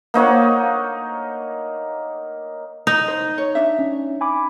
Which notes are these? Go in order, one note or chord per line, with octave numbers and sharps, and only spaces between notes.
A#3 D#4 C#5 F#5
D#4
C5
C#5
D4 E5
C#4
G#5 B5 D6